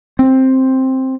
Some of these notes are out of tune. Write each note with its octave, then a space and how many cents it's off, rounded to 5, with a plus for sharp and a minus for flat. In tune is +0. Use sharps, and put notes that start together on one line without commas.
C4 +5